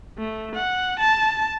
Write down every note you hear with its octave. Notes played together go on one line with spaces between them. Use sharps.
A3
F#5
A5